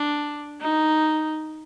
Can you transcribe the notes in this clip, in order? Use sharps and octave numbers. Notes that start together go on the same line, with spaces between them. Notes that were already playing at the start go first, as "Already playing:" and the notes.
Already playing: D4
D#4